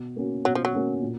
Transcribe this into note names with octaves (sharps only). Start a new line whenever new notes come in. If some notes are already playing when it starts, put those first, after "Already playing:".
Already playing: B2
A#3 C#4 F#4
B2 F#3
F3
F#3
A#3 C#4 F#4
A#2